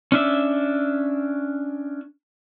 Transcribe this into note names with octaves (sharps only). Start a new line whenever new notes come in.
C#4 D4 E5